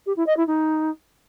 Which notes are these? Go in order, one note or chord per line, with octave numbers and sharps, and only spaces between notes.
G4
E4
D#5
E4
D#4